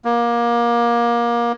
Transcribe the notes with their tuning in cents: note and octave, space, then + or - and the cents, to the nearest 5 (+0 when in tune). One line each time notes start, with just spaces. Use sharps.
A#3 +25